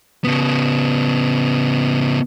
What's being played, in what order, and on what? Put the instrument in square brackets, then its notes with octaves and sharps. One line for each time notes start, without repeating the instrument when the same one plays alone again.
[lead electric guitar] C#3 B3